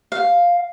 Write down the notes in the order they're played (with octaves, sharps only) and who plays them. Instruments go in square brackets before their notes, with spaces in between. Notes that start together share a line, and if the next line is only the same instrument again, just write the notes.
[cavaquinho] F5